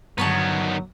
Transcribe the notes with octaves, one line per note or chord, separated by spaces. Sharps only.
G2 D3 D#3 F#3 B3 A#4 C#5 A5